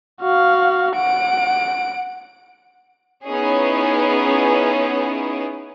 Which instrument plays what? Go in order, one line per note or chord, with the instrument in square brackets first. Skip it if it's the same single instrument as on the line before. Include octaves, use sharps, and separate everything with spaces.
[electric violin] F#4 F5
F#5 D7
[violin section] B3 C#4 D#4 E4 G#4 C#5